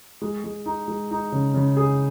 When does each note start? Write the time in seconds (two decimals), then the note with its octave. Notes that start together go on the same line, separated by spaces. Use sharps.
0.22 G#3
0.44 G#3
0.66 D#4
0.88 G#3
1.11 D#4
1.32 C#3
1.54 C#3
1.77 G#4